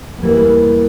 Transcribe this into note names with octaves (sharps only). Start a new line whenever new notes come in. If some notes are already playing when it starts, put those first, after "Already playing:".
B3
E2 C#3 E3 G3 A#3